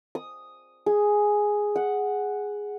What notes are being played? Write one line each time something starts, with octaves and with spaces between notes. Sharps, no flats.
D#6
G#4
F#5